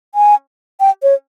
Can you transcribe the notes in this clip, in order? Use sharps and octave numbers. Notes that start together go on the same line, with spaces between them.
G#5
G5
C#5